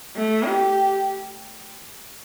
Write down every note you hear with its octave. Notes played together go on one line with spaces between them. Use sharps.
A3
G4